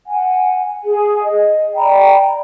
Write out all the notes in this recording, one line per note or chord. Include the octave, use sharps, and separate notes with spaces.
F#5 G#5
G#4 G#5
D#5
D5 G5 A#5 B5